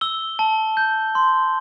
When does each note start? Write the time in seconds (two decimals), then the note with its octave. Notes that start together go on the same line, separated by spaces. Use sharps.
0.01 E6 G7
0.39 A5
0.77 G6
1.15 C6